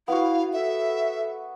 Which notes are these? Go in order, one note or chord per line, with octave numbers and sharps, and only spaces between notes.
B3 E4 F#4 F5
A4 E5